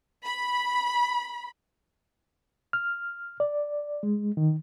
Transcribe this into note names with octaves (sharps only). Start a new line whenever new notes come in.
B5
F6
D5
G#3
D#3